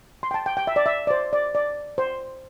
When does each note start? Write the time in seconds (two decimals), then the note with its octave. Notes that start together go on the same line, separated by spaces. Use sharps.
0.23 C6
0.31 G5
0.34 A5
0.46 G5
0.57 G5
0.67 E5
0.76 D5
0.86 E5
1.07 D5
1.10 C5
1.33 D5
1.55 D5
1.98 C5